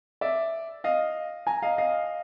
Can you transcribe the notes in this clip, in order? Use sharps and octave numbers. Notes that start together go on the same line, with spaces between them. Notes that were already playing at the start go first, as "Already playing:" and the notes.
D5 E5
D#5 F5
G#5 A#5
D#5 F5
D#5 F5